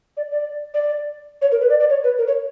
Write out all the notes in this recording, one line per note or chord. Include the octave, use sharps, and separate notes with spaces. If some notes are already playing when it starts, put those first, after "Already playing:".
D5
D5
D5
C#5
A#4
B4
D5
D5
C#5
B4
A#4
C#5